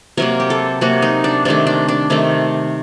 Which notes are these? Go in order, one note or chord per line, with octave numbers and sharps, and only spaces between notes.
C3 F#3 A#3 A#4
G4
A4
C3 F#3 A#3 F#4
D#4
D4
C3 D#3 A3 D4
D4
D4
C3 D#3 A3